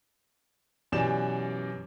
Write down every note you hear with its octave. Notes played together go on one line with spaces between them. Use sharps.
F#2 B2 E3 G4 D5 E7